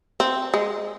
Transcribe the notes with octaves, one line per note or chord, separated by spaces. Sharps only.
C4
G#3